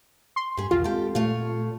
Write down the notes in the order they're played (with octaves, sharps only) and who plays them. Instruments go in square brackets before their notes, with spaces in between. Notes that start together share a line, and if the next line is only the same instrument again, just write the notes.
[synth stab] C6
[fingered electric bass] G2 [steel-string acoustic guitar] G4 G#4
[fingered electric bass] B1 E2 [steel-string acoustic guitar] D#3 [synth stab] F4
[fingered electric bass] G#3 C4 [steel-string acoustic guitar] G4 A4
[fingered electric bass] A#2 [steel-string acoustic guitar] A3 C#5 F5